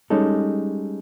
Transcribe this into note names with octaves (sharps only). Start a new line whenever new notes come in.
G3 G#3 C#4 D#4 A4